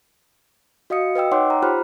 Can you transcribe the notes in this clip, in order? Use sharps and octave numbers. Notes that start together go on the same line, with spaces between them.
F#4 D#5 F5 D#6 C#7
B4 D#5 G5 E6
D#4 C#5 F#5 G5 C6 D6
A#5
F4 G4 C5 B5 F6 F#6